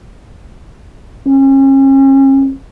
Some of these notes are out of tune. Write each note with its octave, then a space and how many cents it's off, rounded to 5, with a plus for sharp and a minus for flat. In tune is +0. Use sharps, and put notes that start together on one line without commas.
C#4 -35